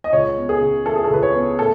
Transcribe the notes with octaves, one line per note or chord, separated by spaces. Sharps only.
D#5
C#2 C#5
B3
G#4
C#3
E3 A4
G#4
A4
C#2 B4
C#5
B3
A2 A4